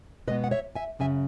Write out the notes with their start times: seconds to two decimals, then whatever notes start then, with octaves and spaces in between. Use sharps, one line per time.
0.27 B2 G#3 B3 B4 D#5
0.44 F#5
0.51 C#5 E5
0.75 E5 G#5
0.99 F#2 C#3 F#3 E5 G#5